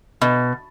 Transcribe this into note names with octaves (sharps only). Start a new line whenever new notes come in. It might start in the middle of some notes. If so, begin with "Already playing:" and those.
B2